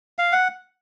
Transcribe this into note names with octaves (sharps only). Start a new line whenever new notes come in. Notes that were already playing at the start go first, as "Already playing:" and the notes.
F5
F#5